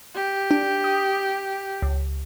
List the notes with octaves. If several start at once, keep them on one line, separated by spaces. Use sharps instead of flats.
G4
D4
D#6
C#2